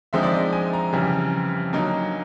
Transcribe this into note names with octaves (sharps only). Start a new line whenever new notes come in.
D3 F3 G#3 C4 D#4 E5
D5
D#5
G#5
A#5
F2 C#3 E3 G3
D3 F#3 A#3 D#4